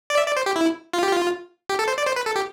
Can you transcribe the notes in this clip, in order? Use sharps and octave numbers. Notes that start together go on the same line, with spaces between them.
D5
E5
D5
C5
G4
E4
F4
G4
F4
G4
A4
C5
D5
C5
B4
A4
G4